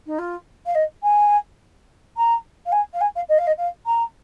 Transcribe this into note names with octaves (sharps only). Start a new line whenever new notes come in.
D#4
F4
F5
D#5
G#5
A#5
F5
G#5
F5
G#5
F5
D#5
F5
D#5
F5
A#5